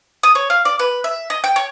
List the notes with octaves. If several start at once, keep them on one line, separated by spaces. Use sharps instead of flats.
D#6
C#5
F5
D5
B4
E5
D#5
G5
C#5